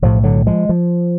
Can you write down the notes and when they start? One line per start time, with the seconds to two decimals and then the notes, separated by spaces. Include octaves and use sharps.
0.02 B1 A2 F3
0.24 D3 F#3
0.47 F3 G#3
0.69 F3